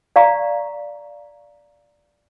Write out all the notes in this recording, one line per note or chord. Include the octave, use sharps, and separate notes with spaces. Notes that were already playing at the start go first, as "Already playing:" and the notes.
D5 F5 A#5 C#6